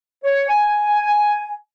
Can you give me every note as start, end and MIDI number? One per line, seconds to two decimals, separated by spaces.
0.24 0.47 73
0.49 1.55 80